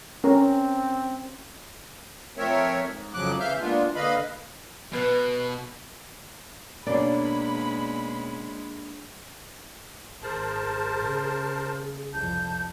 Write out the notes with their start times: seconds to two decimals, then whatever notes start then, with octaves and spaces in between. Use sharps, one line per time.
0.24 C4 C#4 A#4
2.38 F3 A3 C4 A#4 C#5 E5
2.85 G#2
3.14 F2 C#3 F3 F#3 D6 F#6
3.40 C#3 E3 E5 F5 F6 G6
3.60 G#3 A#3 B3 D4 F4
3.95 D3 A#3 B4 D#5 F5 B5
4.93 B2 B4
6.86 B2 G#3 A#3 C#4 D4 D5 B5
10.23 G#1 G#4 A#4 C5 A5
11.03 C#3
12.12 C2 F2 A5 G6